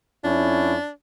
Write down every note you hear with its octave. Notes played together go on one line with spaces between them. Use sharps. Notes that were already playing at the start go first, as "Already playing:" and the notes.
F2 C#4 D4 E4